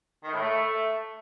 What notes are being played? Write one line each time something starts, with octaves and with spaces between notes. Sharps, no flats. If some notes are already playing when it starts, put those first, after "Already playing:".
D#3
A2
A3